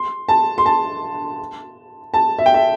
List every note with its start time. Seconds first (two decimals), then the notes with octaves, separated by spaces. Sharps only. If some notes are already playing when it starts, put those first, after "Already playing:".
Already playing: C6
0.29 A5
0.58 C6
0.66 A5
2.14 A5
2.39 E5
2.46 G5
2.54 E5